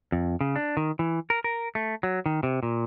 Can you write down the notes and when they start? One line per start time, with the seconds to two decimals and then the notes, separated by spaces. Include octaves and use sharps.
0.12 F2
0.41 C#3
0.56 D4
0.77 D#3
0.99 E3
1.30 A#4
1.44 A#4
1.75 A3
2.03 F#3
2.26 D#3
2.43 C3
2.63 A#2